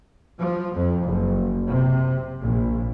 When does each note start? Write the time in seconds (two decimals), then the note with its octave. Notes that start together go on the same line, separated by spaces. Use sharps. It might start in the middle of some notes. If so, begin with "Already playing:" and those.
0.40 F3
0.75 F2
1.07 F#1
1.71 C3
2.42 A#1